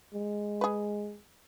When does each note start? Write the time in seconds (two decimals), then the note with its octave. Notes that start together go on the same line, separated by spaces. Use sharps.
0.14 G#3
0.61 G#4 B4